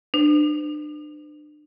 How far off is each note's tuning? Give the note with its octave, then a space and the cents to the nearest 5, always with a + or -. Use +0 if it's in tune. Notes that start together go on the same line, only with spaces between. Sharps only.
D4 +35 C5 -45